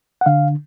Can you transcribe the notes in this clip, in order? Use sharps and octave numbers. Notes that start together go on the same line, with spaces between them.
F#5
D3 F5